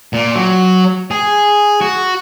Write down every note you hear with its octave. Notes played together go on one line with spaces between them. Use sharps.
A#2
F#3
G#4
F#4